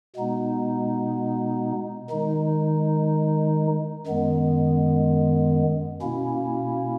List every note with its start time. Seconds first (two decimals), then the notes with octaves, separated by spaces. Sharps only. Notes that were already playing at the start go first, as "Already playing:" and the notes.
0.16 B2 G#3 B3 D#4
2.11 D#3 G#3 D#4
4.06 F#2 D#3 G#3 B3
6.02 B2 A#3 C#4 E4